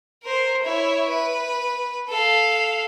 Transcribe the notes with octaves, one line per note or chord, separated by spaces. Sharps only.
A#4 C5
E4 C#5
B4
A4 F5